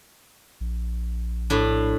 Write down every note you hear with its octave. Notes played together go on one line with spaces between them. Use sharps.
A#1
A2 D4